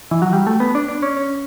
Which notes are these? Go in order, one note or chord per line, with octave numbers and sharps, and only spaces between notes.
E3
F#3
G3
A3
B3
D4
D4
C#4
C#4